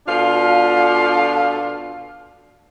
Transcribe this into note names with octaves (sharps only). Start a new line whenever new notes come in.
B2 D4 F4 A4 F5